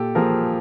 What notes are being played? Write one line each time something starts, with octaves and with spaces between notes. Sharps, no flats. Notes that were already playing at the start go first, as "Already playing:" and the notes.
Already playing: A#2 G4 A4
F3 A#3 G#4 A#4